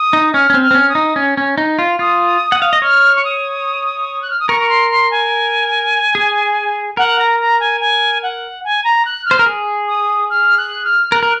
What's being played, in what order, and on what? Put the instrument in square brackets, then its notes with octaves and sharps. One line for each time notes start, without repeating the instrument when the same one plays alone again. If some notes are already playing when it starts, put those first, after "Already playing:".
Already playing: [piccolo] D#6
[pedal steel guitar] D#4
[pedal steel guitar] C#4 [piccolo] F6
[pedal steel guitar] C#4
C4
[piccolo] F6
[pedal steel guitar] C4
C#4
[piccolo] D#6
[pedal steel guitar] D#4
C#4
C#4
D#4
F4
[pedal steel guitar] F4 [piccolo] D#6
[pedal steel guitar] F#5
F5
D#5
[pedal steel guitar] C#5 [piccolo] F6
[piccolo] C#6
D#6
F#6
F6
D#6
[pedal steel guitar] A#4 [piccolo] C#6
[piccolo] C#6
C6
C6
G#5
[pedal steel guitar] G#4
[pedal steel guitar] A#4 [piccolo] F#5
[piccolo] A#5
A#5
G#5
G#5
F#5
G#5
A#5
F#6
F6
[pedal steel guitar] C5
A#4
G#4
[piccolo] D#6
F6
F#6
F6
[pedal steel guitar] A#4 [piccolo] F#6
[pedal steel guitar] A#4